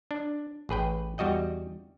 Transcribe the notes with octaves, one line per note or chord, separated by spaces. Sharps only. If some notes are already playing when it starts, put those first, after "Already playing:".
D4
A1 G#4 B4 G5
E2 G3 F#4 D#5 G5